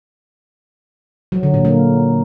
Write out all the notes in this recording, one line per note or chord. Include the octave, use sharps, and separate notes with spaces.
F#3
D3
A#2
A#3